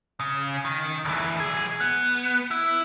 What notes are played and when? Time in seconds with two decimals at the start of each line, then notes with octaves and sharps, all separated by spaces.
0.20 C#3
0.65 D#3
1.05 D2 E3
1.40 B1 G#4
1.81 B3
2.51 E4